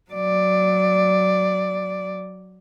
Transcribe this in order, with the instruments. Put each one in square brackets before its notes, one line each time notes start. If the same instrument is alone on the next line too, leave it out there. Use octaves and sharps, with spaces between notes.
[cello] F#3 D5